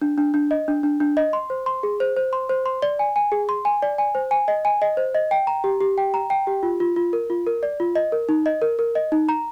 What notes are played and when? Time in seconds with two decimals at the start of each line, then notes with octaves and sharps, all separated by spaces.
0.02 D4
0.18 D4
0.34 D4
0.51 D#5
0.68 D4
0.83 D4
1.00 D4
1.17 D#5
1.33 C6
1.50 C5
1.66 C6
1.83 G#4
2.00 C5
2.16 C5
2.33 C6
2.49 C5
2.66 C6
2.82 D5
2.99 G#5
3.16 G#5
3.32 G#4
3.49 C6
3.65 G#5
3.82 D5
3.98 G#5
4.15 C5
4.31 G#5
4.48 D#5
4.65 G#5
4.82 D#5
4.97 C5
5.15 D#5
5.31 G5
5.47 A#5
5.64 G4
5.81 G4
5.98 G5
6.14 A#5
6.30 G5
6.47 G4
6.63 F4
6.80 F4
6.96 F4
7.13 A#4
7.30 F4
7.47 A#4
7.63 D5
7.80 F4
7.95 D#5
8.12 A#4
8.29 D#4
8.46 D#5
8.62 A#4
8.79 A#4
8.95 D#5
9.12 D#4
9.29 A#5